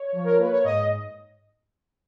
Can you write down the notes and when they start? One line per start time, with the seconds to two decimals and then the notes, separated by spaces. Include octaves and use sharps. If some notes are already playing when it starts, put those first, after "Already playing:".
Already playing: C#5
0.13 F3
0.24 A#4
0.38 A#3 B4
0.51 C#5
0.64 G#2 D#5